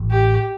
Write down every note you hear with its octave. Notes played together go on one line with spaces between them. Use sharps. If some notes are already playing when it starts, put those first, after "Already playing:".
Already playing: A1 A2 F#3
G4